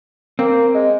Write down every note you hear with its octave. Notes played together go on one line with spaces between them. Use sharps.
A#3 C4
G#3